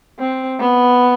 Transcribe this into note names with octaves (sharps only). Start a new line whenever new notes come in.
C4
B3